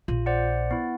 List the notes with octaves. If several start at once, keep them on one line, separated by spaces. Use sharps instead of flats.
A#1 F4
C5 D5 F#5
B3 E4